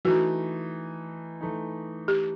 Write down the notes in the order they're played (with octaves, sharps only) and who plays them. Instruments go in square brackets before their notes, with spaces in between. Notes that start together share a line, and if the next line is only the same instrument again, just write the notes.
[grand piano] E3 A3 D#4 [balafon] F#4
[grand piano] E3 A3 D#4
[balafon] G4